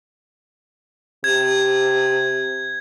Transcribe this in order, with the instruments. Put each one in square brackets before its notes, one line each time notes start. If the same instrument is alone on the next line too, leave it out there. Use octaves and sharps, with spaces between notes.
[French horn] C3 [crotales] G#6